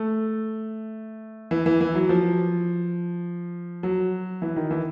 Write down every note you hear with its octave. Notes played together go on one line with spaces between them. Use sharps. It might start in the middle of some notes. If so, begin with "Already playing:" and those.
Already playing: A3
E3
E3
E3
F#3
F3
F#3
E3
D#3
E3